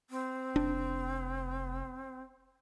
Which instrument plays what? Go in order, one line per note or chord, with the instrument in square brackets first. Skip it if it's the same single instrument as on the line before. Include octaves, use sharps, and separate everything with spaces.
[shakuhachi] C4
[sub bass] F1 [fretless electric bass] D4